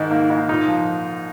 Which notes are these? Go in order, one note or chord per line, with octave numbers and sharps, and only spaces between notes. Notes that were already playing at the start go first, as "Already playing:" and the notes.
Already playing: G#2 D#3
A#3
G#2
A#2 D#4
F3